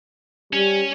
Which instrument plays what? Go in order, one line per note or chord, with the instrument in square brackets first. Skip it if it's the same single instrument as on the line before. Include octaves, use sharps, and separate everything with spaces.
[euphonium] G3 [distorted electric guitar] C#4